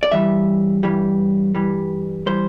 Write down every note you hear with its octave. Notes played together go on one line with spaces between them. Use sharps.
D5
G2 E3 G3 E5
G2 E3 G3
G2 E3 G3
E3 G3 C5